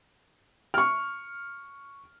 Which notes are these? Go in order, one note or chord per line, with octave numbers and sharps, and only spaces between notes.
C#6 F6